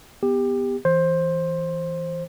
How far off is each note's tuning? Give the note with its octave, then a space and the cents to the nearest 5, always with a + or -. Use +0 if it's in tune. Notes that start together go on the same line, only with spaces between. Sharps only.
B3 +0 G4 +20
E3 +0 C5 +15